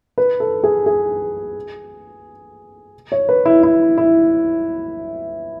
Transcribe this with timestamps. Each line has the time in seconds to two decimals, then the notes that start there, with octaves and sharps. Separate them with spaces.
0.18 B4
0.40 A4
0.63 G#4
0.86 G#4
3.12 C#5
3.29 B4
3.46 E4
3.63 E4
3.98 E4